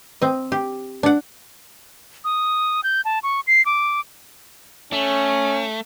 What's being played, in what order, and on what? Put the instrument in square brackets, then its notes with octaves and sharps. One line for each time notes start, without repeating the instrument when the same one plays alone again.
[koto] C4 D#5
G4
D4 F#5
[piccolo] D#6
G6
A5
C#6
C7
D6
[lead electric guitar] A3 [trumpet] C#4